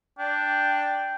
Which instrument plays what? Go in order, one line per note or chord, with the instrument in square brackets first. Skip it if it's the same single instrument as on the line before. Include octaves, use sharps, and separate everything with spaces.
[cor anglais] D4 [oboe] G5